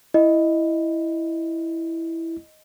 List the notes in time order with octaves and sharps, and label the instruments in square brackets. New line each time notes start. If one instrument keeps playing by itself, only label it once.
[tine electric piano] E4 [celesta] D#5